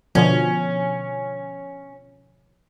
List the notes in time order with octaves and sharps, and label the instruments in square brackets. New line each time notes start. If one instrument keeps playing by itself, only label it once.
[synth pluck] B2 D3 F3 [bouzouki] C#4